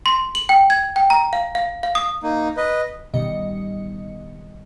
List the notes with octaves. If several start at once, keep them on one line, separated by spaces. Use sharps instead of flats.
C6
F#7
G5
G#6
G5
A#5
F5
F5
F5
D#6
A#3 D#4
B4 D#5
A1 B2 D#3 G3 D#5 C#7